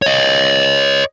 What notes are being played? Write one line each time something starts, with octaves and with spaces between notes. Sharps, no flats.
C#5 D#5